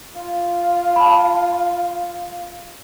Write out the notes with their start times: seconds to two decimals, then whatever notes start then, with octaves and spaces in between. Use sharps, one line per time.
0.15 F4
0.96 A5 B5